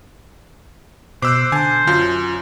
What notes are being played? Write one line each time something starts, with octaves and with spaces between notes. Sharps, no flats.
B2 C5 D6 E6 F#6
D3 G#5 A5
F#2 F4